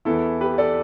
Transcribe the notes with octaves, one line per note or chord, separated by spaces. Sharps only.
E2 E3 E4 A4
G4 B4
A4 D5